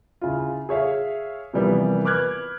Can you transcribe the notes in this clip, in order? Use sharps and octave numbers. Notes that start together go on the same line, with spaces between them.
C#3 E4 F4
G#4 C#5 E5 F5
C3 E3 F3 G3 A#3 B3
B4 D6 F6 F#6 G#6